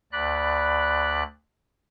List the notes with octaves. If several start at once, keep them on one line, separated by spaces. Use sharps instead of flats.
D2 D5 B5 F#6